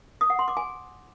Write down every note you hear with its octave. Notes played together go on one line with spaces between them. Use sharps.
D#6
F#5
C6
D6
G#5